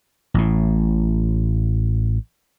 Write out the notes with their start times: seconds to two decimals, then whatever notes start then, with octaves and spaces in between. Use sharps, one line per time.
0.34 A1 A2